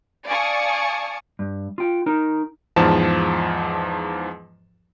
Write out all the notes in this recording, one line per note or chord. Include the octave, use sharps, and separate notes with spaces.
D5 F5 G#5 A5 C#6 D#6
G2
F4 G5
D#4 A#4
E2 G#2 F3 A5